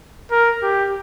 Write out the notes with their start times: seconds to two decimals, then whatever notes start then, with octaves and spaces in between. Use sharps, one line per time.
0.31 A#4
0.62 G4